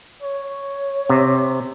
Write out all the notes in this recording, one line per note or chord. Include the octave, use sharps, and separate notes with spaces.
C#5
C3